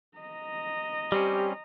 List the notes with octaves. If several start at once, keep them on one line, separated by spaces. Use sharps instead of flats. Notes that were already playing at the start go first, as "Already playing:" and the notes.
D#5 A#5
G3 C4 C#4 G4